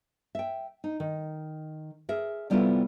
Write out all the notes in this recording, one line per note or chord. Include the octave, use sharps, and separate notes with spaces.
E5 G5
D#4
D#3
G#4 A#4 E5
C3 G3 B3 E4 F4 A4